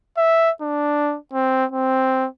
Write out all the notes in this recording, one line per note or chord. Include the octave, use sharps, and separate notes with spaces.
E5
D4
C4
C4